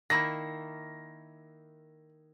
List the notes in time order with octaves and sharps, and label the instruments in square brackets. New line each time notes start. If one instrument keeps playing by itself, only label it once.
[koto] D#3 A#3 E4 [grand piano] A#6